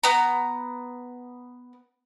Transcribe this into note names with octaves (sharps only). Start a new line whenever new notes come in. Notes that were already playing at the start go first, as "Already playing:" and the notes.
B3 A#5